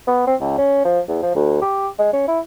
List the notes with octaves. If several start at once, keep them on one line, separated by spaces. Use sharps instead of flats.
B3
C4
C#2
C#4
F3
E2
F3
D2
G4
G#3
C#4
E4